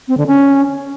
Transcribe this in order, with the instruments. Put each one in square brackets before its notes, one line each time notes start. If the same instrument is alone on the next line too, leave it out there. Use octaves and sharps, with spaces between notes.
[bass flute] C4
D3
C#4